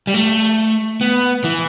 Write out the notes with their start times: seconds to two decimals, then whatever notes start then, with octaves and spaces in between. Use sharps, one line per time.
0.07 G3
0.14 A3
1.01 B3
1.44 E3